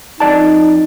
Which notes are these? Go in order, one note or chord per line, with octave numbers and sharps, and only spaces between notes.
F2 D#4 D5 A5